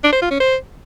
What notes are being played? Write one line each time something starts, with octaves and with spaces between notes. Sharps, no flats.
D4
C5
F4
C#4
C5